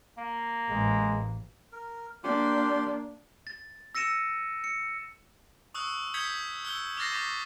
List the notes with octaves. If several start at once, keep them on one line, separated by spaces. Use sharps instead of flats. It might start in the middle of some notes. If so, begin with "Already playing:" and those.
A#3
A1 G#3
A#4
A#3 D4 G4 C6
A6
E6 A#6 C#7 D#7 E7
C#7
C#6 D#6 E6 F#6
D#6 G6 G#6 B6 C#7 G7
E6 F#6 G7
D6 F6 G6 A6 A#6 C7
C#6 D6 F#6 B6